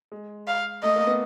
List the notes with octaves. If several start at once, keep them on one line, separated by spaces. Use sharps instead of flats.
G#3
F5
A3 D#5
A#3
B3